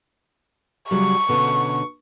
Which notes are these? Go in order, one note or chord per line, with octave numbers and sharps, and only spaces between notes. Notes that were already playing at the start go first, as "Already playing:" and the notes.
C#3 F#3 G3 C#6
B2 D3 C#4